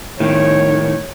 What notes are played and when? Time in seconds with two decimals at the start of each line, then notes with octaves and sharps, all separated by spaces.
0.20 A2 D#3 C#5